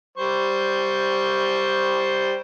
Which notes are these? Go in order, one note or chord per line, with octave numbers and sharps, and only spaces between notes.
G3 C5 C#6